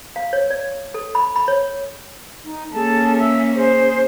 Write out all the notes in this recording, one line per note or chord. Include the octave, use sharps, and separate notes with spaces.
F5
C#5
D5
A4
B5
B5
C#5
D#4
A#3 C#4 G#4 A4 A5
E5 E6
G#4 C5